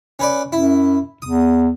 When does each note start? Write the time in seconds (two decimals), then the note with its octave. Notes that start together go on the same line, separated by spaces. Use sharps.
0.19 C#4 B4 D5
0.52 F#2 E4
1.22 E2 D#6